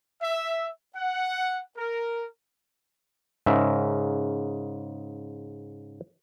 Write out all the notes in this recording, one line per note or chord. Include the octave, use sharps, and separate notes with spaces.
E5
F#5
A#4
G#2 C#3 A#4 E5